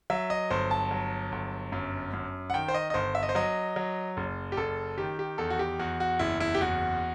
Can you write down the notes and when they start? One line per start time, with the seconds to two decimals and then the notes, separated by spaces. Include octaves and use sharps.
0.10 F#3 E5
0.30 D#5
0.50 G1 C5
0.71 A5
0.91 F#3
1.32 G1
1.72 F#2
2.13 F#2
2.50 F#5
2.54 D#3 G5
2.68 C5
2.74 D#5
2.90 D#5
2.94 G1 C5
3.15 E5
3.23 D#5
3.29 C5
3.35 F#3 D#5
3.76 F#3
4.17 F#1
4.52 G4
4.57 F#1 A4
4.98 D#3 G4
5.19 G4
5.38 E2 A4
5.50 F#4
5.59 G4
5.79 E2 F#4
6.00 F#4
6.19 F#1 E4
6.40 E4
6.55 G4
6.61 E2 F#4